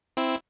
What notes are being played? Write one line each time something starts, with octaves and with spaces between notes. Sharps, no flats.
C4 E4